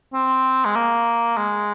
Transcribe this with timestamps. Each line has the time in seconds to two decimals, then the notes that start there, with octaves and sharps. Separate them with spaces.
0.14 C4
0.65 G#3
0.76 A#3
1.37 G#3